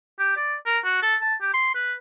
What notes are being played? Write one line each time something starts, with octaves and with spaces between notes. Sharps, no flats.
G4
D5
A#4
F#4
A4
A5
G4
C6
B4